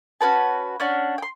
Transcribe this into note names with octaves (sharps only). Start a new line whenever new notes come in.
C#4 F#4 B4 A5
C#4 D4 F#5
G5 C6